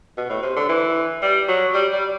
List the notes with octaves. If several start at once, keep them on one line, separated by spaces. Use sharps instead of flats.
B2
A2
C3
D3
E3
G3
F#3
G3
G3